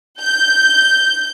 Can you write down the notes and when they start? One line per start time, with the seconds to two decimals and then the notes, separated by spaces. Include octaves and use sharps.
0.21 G6